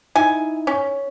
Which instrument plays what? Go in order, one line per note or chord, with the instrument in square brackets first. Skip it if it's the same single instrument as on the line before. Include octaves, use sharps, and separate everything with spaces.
[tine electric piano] D#4 E4 E5 [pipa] G#5
[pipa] C#4